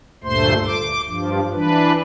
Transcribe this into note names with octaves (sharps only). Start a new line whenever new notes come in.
D2 G2 A#2 A3 C5 C6
D6
G2 F3
E3 D4 B4